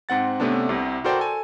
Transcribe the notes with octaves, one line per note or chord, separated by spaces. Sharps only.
G#2 C4 F#5 A6
C3 A3 B3 C#4 D4
C2 C3
F#4 A4 A#4 C5 D5 G5
A4 G#5